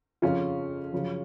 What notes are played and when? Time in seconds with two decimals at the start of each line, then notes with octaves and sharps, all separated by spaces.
0.22 F2 C#3 F3 C#4 F4
0.92 F#2 C#3 F3